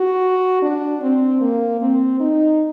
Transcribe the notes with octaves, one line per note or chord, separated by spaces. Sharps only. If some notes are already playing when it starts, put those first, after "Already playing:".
Already playing: F#4
D4
C4
A#3
C4
D#4